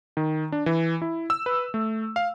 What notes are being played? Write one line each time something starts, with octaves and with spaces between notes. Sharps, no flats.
D#3
D4
E3
E4
E6
B4
A3
F5